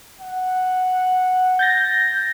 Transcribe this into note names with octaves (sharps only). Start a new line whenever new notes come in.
F#5
G6 A6 A#6